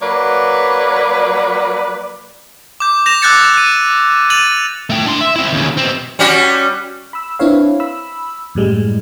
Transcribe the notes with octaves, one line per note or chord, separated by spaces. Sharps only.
F#3 A#3 B4 C#5 D5
D6 G6
G6 A#6 E7 F7
D6 E6 F#6 G6 A6 C#7
F#6 D#7
A6 D#7 F7 F#7
A3 G5
D4 C6
E5
C4 E4
D#2 C#3
B2 C4
G3 C#4 F#4
B5 E6
C4 D4 E4 B4 C#5 F5
B5 E6
F#2 A2 G3 G#3